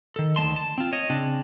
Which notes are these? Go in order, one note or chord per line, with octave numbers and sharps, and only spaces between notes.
D#3 A4
D2 D#3 G#3 A5 C6
A5
C4 F4
C#5 D#5
C#3 C4 D4